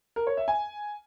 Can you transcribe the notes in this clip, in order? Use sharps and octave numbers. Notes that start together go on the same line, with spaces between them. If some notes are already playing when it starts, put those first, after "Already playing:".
A#4
C#5
E5
G#5